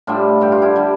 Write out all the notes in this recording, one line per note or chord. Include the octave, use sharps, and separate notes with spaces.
A2 G3 D4 F4
G2 D3 G3 G4
F4
E4 G4
D3 G3